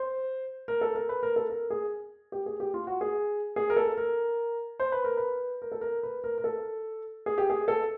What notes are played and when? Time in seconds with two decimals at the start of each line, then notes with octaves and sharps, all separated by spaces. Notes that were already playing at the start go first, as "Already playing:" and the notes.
Already playing: C5
0.68 A#4
0.81 A4
0.95 A#4
1.09 B4
1.23 A#4
1.36 A4
1.50 A#4
1.70 G#4
2.32 G4
2.46 G#4
2.60 G4
2.74 F4
2.87 F#4
3.01 G#4
3.56 G#4
3.70 A#4
3.77 A4
3.97 A#4
4.80 C5
4.92 B4
5.04 A#4
5.17 B4
5.62 A#4
5.72 A4
5.81 A#4
6.03 B4
6.24 A#4
6.38 A#4
6.44 A4
7.26 G#4
7.38 G4
7.50 G#4
7.68 A4